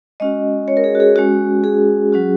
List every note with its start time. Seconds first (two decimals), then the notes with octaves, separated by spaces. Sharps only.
0.20 G#3 C#4 F#4 D#5
0.68 C#5
0.77 A#4
0.84 G#4
0.95 F#4
1.00 G#4
1.16 G#3 C#4 F#4
1.64 G#4
2.12 F#3 C#4 F#4